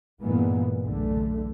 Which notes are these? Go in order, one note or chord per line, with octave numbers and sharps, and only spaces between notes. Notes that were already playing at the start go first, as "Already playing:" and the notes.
G2 A#2 E3 G#3 A#3 B3
B1 E2 D3 A3